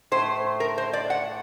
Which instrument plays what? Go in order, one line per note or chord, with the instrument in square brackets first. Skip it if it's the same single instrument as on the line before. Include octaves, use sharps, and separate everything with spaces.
[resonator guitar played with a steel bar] A2 A3 C5
A#4
C5
D5
F#5